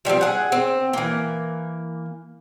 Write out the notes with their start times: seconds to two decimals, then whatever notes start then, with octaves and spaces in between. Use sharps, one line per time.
0.05 F3 G3 A#3 C4
0.21 G#4 F#5
0.52 C4
0.93 E3 A#3